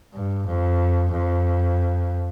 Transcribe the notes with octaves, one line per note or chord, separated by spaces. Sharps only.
G2
F2
F2